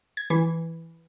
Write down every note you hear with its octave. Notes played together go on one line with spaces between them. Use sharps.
G#6
E3